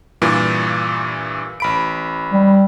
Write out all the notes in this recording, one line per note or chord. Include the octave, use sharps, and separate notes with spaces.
G2 A#2 E3
A1 B5 D7
G3